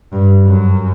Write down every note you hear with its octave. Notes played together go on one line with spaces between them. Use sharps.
G2
F#2